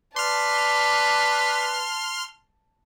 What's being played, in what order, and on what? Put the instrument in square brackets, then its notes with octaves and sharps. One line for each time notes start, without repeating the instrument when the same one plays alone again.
[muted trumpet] B4 [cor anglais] D5 [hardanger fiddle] A5 [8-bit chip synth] C6 F6